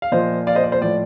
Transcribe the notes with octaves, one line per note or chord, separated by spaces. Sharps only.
F5
A#2 F3 C5 D#5
D5 F5
C5 D#5
D5
C5
A2 F3 D5